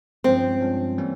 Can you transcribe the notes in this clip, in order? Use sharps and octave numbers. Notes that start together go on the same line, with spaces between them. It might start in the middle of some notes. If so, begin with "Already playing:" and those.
G2 F3 G#3 C4 C#4
G2 F3 G#3 C#4
E3 G3 A#3 C#4